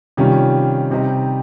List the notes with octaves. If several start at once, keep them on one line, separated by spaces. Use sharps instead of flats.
C3 D#3 G3 C#4 F4
C3 G3 C4 D#4